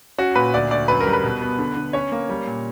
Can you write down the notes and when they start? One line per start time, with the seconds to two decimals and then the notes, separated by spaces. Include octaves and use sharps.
0.18 C#4 F#4
0.35 A#2 B4
0.54 D2 D5
0.71 D2 D5
0.88 F#2 B4
1.01 A#4
1.07 G3
1.13 B4
1.23 B2
1.42 B3
1.59 D3
1.76 D3
1.93 C#4 C#5
2.12 A#3
2.29 G3
2.47 A#2